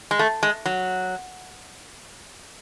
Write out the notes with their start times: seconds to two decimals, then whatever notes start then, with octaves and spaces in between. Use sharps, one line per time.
0.11 G#3
0.19 A3
0.43 G#3
0.66 F#3